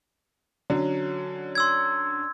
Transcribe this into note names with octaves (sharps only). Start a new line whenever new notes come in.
D3 F#3 C#4
C6 E6 G#6